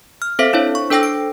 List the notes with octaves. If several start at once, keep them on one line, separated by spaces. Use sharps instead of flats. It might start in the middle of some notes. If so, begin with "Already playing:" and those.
F6
C4 A4 C5 E5 F5 B6
D4 E4 C5 C#5
C#6
D4 A4 C5 G5 E6 A#6
D7